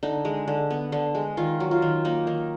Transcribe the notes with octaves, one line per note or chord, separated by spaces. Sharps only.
D3 D#4
G#3
D3
B3
D3
G#3
D#3 F4
F#3
F4
D#3
A#3 D#4
D#3